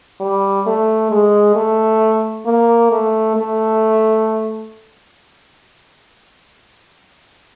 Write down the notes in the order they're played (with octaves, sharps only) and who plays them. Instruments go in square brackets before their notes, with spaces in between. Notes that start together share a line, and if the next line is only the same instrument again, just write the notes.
[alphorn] G3
A3
G#3
A3
A#3
A3
A3